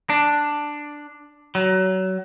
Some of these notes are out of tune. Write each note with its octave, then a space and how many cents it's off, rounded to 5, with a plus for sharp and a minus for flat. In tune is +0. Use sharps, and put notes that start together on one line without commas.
D4 +5
F#3 +25